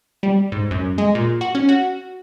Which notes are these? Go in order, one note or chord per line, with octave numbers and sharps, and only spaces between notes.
G3
G#2
F#2
G#3
A#2
F#4
C#4
F#4